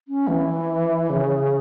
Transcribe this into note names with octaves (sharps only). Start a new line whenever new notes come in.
C#4
E3
C#3